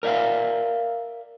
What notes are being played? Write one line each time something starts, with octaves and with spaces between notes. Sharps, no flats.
A#4 D5 E5 F5